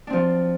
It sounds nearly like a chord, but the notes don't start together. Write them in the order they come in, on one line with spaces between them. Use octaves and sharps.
D4 C4 F3